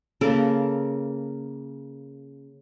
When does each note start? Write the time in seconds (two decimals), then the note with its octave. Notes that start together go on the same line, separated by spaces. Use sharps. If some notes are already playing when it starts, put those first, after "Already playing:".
0.21 C#3 A#3 A4 A#4